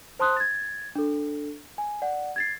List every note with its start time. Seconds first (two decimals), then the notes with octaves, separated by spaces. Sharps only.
0.19 C5 A5 C6 D#6 F#6
0.37 G#6 A6
0.95 D4 A4
1.78 G#5
2.02 D5 F#5
2.36 G#6 A6 C7